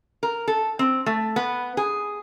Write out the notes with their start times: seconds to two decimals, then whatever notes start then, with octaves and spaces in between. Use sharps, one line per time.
0.23 A#4
0.48 A4
0.79 C4
1.06 A3
1.36 B3
1.77 G#4